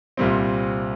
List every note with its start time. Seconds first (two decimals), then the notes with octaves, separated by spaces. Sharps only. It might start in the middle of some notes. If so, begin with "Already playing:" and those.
0.17 C2 A#2 G3 C4